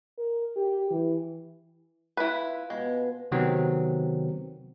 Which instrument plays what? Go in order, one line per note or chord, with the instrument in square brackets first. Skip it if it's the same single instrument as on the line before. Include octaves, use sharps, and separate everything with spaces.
[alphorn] A#4
G4
E3
[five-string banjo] E4 B4 [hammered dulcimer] F4
[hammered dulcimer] B2 [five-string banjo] G#3
[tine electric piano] C3 D#3 F#3 B3 C4